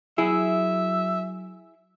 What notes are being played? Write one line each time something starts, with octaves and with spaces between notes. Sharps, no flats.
F#3 E4 G#4 E5